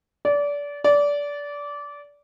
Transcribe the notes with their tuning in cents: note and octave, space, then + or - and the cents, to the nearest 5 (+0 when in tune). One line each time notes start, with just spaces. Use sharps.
D5 -25
D5 -20